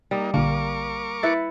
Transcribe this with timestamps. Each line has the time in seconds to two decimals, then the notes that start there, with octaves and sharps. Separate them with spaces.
0.11 G3 A#3 D#4
0.34 A#1 D3 A#3 A#4 C#6 D6
1.23 E4 B4 E5 A6 C#7